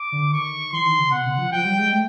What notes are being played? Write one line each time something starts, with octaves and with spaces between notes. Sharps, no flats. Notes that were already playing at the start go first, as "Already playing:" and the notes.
Already playing: D6
D3
D#3 C#6
E3 C6
D#3
C#3
B2 F#5
C#3
F3
F3 G5
G3
G#3
A3